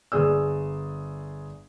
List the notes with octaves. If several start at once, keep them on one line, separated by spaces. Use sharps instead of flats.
G1 G#4 D5 E6